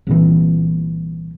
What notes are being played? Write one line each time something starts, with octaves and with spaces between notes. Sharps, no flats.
C2 A#2 E3